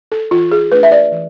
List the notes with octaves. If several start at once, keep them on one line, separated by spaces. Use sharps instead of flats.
A4
E3 F4
G#4
A3 D4 B4
E5
D5
E3